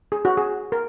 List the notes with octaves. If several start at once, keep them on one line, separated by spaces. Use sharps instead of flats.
G#4
F#4
G#4
A#4